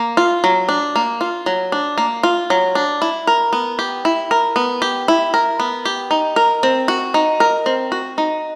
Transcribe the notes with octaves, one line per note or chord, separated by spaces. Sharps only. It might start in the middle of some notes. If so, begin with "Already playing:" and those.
Already playing: A#3
F4
F#3
D4
A#3
F4
F#3
D4
A#3
F4
F#3
D4
E4
A#4
B3
G4
E4
A#4
B3
G4
E4
A#4
B3
G4
D#4
A#4
C4
F#4
D#4
A#4
C4
F#4
D#4